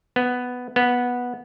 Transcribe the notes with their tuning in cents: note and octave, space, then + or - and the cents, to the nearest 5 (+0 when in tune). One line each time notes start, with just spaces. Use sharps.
B3 +5
B3 -10